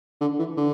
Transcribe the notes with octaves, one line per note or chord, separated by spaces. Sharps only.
D3
E3
D3